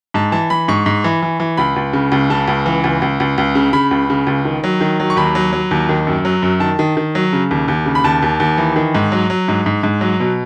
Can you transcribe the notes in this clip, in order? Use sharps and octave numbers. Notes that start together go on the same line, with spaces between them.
G#2 A5
E3 A5
E3 B5
G#2 C#6
G#2
E3
E3
E3
C#2 B5
C#2
C#3
C#2
C#3 A5
C#2
E3
C#2
C#2
C#2
C#2
C#3
C#3 B5
C#2
C#3
C#2
D#3
F#3
D#3
F#3
C#6
D#2 B5
F#3
F#3
D#2
D#3
F#2
F#3
F#2
D#3 A5
D#3
D#3
F#3
C#3
D#2
D#2
C#3
B5
D#2 A5
D#2
D#2
E3
D#3
G#2
F#3
F#3
G#2
G#2
G#2
F#3
B2